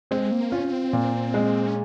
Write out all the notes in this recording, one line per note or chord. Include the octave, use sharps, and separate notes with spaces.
G#3 C4
A#3
C#4 F4
C4
A#2
G#3
C#4